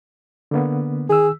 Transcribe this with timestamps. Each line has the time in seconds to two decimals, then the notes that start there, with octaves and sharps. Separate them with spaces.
0.51 D3 A#3 B3
1.09 D#3 G#4 E6